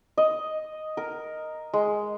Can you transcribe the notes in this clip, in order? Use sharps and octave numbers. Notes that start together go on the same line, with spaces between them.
D#5
A#4
G#3